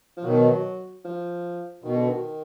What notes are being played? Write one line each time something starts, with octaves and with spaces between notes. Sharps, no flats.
F3
B2 D#3 F#3
F3
B2 D#3
D3
D#3